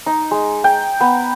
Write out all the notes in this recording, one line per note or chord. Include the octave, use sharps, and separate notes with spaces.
D#4
G#3
G5
B3